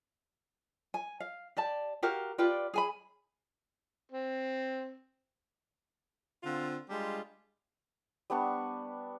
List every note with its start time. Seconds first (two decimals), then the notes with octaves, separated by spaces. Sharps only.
0.94 G#5
1.20 F5
1.57 G4 D5 A5
2.03 F#4 G4 A#4 F5
2.38 F4 G4 B4 D5
2.74 G#4 G#5 B5
4.11 C4
6.43 D3 C4 F4
6.90 G3 G#3 D4 F4
8.30 G3 B3 D4 C#6